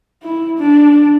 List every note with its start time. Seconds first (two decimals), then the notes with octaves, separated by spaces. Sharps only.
0.23 E4
0.59 D4